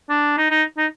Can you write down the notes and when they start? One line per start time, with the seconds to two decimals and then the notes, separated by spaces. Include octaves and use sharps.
0.10 D4
0.38 D#4
0.51 D#4
0.77 D#4